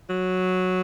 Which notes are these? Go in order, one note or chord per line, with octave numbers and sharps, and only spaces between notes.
F#3